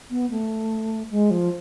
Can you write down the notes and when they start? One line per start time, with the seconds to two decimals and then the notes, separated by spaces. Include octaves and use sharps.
0.11 B3
0.31 A3
1.11 G#3
1.31 F3